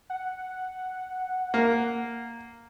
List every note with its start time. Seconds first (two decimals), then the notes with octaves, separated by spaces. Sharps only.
0.10 F#5
1.54 A#3